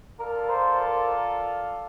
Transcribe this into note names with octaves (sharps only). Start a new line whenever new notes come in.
F4 A4 A#4 D5 F5
C5
A#4